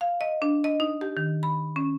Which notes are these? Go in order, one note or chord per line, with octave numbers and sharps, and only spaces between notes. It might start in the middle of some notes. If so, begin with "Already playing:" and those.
F5
D#5
D4
D#5
D#4
G4
D#3
B5
C#4